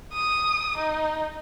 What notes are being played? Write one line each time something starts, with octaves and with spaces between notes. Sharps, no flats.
D#6
D#4